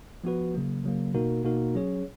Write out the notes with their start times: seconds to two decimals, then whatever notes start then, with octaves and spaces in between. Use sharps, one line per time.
0.24 F3 B3 F#4 B4
0.54 C#3 F#3 A#3
0.84 C#3 F#3 A#3
1.14 B2 A#3 D#4 F#4 A#4
1.44 B2 A#3 D#4 F#4 A#4
1.75 F#3 C#4 G#4 C#5